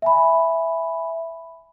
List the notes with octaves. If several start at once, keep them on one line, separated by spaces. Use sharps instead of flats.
E5 G#5 B5